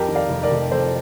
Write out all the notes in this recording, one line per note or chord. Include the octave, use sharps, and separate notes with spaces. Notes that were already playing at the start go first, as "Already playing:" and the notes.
Already playing: F2 G4 A#4
D#3
D5 F5
F1
A#4 D5
F1
F2 A4 C5